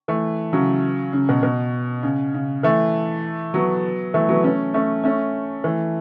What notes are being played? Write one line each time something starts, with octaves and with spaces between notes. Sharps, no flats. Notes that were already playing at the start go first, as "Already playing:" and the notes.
E3 A3
C#3 F#3
C#3
B2
B2
C#3
C#3
E3 A3
F#3 B3
E3 A3
F#3 B3
A3 C#4
A3 C#4
A3 C#4
E3 A3